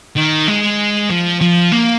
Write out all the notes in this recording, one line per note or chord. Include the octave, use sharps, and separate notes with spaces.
D#3
G#3
F3
F3
A#3